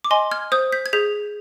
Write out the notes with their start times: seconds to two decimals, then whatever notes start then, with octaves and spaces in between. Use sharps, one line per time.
0.04 D6
0.11 D#5 G#5 C6
0.31 F6 G#6
0.52 C5 D#6 G6
0.72 G6 B6
0.86 G#6
0.93 G#4 G6 B6